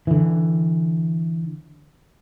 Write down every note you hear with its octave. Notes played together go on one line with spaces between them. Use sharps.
D3 E3